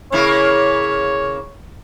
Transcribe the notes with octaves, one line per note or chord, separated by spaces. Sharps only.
C#3 A#3 E4 C#5